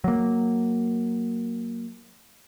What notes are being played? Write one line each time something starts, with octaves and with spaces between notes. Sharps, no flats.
F#3 A#3